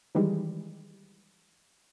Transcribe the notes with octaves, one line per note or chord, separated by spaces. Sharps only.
D#3 E3 G3 G#3